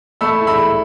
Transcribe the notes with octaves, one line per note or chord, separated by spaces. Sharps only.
A3 B5 E6
E4
B5 E6